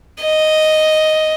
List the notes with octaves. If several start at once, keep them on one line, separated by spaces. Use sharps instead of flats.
D#5